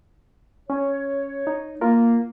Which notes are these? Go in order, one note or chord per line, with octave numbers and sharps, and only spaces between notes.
C#4 C#5
D#4
A#3 F4 A#4